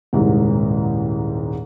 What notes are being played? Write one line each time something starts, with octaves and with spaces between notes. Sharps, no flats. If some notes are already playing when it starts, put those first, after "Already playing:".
D#1 C2 G#2